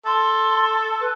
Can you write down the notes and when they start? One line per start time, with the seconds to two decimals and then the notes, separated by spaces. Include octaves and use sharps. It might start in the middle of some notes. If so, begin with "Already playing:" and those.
0.06 A4 C6
1.00 B4